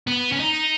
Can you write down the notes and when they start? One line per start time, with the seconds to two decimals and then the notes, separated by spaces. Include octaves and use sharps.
0.07 B3
0.32 C#4
0.39 D#4